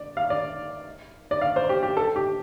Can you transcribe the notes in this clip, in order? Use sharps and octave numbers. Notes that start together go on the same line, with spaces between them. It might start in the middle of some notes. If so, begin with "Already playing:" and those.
Already playing: D5
F5
D5
D5
F5
C5
G4
G4
A4
G4